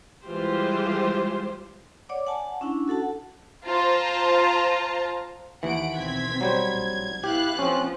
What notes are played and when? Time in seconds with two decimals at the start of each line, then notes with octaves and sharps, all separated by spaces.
0.25 E3 G3 G#3 F4 G4 C5
2.09 C#5 D5 F#5 D6
2.27 F#5 G#5 A5
2.61 C#4 D4 E4 F#5
2.88 F#4 A4 F#5 A5
3.65 F4 C5 A5 A#5
5.63 D#2 E3 F#5 D7
5.96 B1 C4 G#6 B6
6.41 F#3 G3 C5
6.70 A#1
7.24 B3 E4 G4 F5 F#6
7.59 F3 C4 C#4